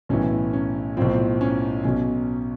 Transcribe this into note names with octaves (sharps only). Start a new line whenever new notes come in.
B1 A2 E3 C#4
C#4
B1 A2 F3 C4
C#4
B1 B2 C#4